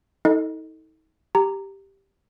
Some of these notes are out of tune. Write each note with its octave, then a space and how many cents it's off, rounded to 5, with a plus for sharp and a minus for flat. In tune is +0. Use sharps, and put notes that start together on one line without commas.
D#4 +40 A4 +10 D#5 +0
G4 +0 A#5 -10